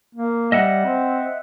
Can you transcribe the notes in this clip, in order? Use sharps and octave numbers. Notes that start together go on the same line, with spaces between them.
A#3
G3 D#5 E5 F#5
C4